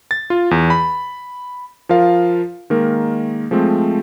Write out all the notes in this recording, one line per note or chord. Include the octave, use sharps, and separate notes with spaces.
A6
F4
E2
B5
F3 F4 A#4 F5
D#3 G#3 A#3 A#4
F3 G#3 A3 C4